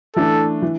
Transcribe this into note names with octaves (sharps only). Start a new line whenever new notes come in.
E3 A3 D4 A4
E3